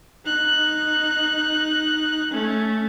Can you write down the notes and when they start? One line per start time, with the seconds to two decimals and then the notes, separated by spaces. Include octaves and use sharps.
0.25 D#4 F#6
2.31 A3 C#4